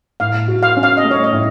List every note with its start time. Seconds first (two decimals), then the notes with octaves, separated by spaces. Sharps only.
0.20 A2 F5
0.48 F#4
0.63 F5
0.77 C#4
0.83 F5
0.97 D#5
1.04 A3
1.11 C#5
1.24 D#5
1.32 A2